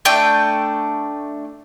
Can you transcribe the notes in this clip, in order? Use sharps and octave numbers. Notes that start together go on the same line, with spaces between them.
A3 D4 G5